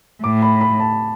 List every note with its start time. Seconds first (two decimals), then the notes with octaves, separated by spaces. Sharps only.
0.23 A2 D6
0.42 B5
0.61 B5
0.80 A5